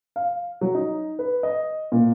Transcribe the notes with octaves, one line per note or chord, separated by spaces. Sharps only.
F5
F#3
D#4
B4
D#5
A#2